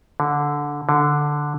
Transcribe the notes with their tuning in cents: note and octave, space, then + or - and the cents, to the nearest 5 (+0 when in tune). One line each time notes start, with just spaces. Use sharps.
D3 -10
D3 +0